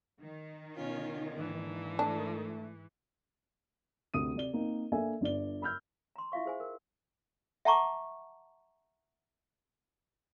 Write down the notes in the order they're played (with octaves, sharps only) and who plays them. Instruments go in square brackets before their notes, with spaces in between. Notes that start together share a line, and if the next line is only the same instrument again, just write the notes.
[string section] D#3
[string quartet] B2 C#4 F4
[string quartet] G#2 E3 [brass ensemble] A#3 D4 D#4
[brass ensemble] A3 [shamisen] D4
[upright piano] D2 C3 D#6 D#7
C3 D5 G7
A#3 C4 D#4
A#3 D4 A4 E5 G#5
G1 G2 D5 G7
B5 E6 F6 G6
[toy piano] A#5 C6
E4 F4 E5 F5 C#6
G#4 C5 G#5
A#4
E5 F#5 A5 A#5 C#6 D6